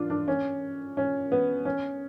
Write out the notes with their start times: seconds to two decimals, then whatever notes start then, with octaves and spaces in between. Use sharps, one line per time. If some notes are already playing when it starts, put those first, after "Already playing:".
Already playing: D4 F4
0.10 D4
0.28 C#4
0.97 C#4
1.32 B3
1.65 C#4